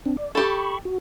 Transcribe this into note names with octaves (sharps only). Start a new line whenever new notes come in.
C4 D4
D5
G4 A4 B5 C#6
F#4